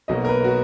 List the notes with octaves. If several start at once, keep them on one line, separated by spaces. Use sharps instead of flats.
B1 B2 A#3 D#5
A#4
B4
F#4